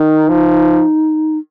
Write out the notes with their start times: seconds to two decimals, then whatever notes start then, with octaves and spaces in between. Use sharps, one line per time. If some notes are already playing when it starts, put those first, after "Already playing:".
Already playing: D#3 D#4
0.29 F3